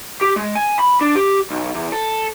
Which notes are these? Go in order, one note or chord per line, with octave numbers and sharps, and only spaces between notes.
G4
G#3
G#5
B5
D4
G4
B1
E2
A4